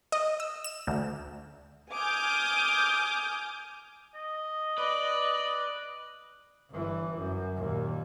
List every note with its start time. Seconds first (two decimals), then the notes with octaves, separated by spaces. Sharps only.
0.12 D#5
0.40 E6
0.64 E7
0.87 D2
1.93 G#5 D6 D#6 F6 G6
4.15 D#5
4.78 B4 D5
6.71 G1 E3
7.18 F#2
7.56 D#2 A#2